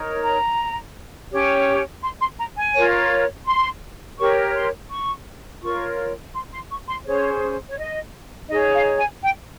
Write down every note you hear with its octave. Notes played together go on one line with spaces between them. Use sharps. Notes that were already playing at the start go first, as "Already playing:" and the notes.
Already playing: D#4 A#4 C#5
A#5
C#4 G4 C#5
C6
C6
A#5
G#5
F4 A#4 C#5
C6
G4 A#4 C#5 C#6
C6
C#6
F4 A#4 C#5 C#6
C6
C6
C#6
C6
C#4 G#4 C5 C#5
C#5
D#5
D#4 G#4 C#5 D#5
F5
G#5
G5